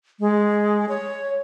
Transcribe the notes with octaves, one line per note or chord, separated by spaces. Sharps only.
G#3
C#5